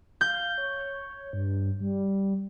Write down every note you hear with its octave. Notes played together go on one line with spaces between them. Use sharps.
F5 G6
C#5
G2
G3